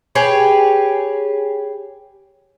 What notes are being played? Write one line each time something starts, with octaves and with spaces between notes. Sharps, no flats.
G4 G#4 B4 C#5